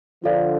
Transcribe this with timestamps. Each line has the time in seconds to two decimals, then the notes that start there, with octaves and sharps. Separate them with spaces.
0.23 D3 F3 F4 A4 D5 F5